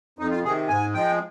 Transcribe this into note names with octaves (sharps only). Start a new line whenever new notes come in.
F2 D#4
F4
C3 D#3 G#4
G#2 G#5
F3 G#3 G5